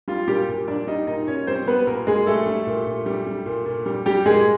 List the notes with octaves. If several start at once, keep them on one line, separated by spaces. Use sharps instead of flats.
G3 F4
A#2 G3 G4
A#2
G3 D4 D5
G3 D#4 D#5
A#2 D#4 D#5
A#2 C#4 C#5
G3 C4 C5
G3 B3 B4
A#2 A#3 A#4
A#2 G#3 G#4
G3 A3 A4
G3
A#2
A#2
G3
G3
A#2
A#2
G3
G3 G4
A#2 G#3 G#4